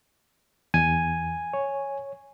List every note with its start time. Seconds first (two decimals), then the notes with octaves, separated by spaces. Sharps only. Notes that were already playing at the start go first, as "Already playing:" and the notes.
0.74 E2 G#5
1.53 C#5